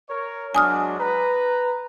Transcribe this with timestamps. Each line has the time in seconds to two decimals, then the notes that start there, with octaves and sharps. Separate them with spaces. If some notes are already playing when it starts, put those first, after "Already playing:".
0.10 A#4 C#5
0.55 F#3 G#3 D4 G#5 D#6 F6
1.00 B4 A#5